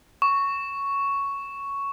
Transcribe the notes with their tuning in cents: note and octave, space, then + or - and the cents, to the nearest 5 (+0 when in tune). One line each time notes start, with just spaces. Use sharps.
C#6 +5